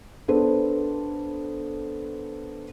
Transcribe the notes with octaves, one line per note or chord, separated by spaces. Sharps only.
B3 D4 A4 C5